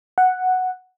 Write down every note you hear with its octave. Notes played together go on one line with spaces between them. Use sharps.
F#5